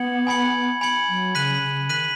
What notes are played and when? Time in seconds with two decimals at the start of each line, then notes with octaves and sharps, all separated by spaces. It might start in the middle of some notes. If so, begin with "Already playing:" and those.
Already playing: B3 G#6 C#7 F#7
0.27 G#5 B5 G#6 C#7 F#7
0.81 G#5 B5 G#6 C#7 F#7
1.09 F#3
1.35 C#3 F#6 B6 D#7 F#7
1.62 C#3
1.89 D#3 F#6 B6 D#7 F#7